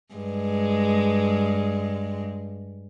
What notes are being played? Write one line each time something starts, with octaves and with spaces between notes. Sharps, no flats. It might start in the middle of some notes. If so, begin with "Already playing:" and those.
G2 G#3